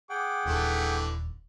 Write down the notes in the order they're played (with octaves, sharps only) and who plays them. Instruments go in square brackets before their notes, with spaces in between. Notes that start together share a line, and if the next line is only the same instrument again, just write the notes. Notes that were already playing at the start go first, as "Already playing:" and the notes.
[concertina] G#4 F#5 G5 [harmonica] D6
[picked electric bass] D#1 [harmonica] D3 E3 A3